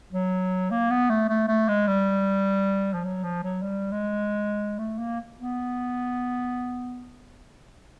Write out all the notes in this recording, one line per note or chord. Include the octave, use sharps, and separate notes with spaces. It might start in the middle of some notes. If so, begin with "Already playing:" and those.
F#3
A#3
B3
A3
A3
A3
G#3
G3
F3
F#3
F3
F#3
G3
G#3
A3
A#3
B3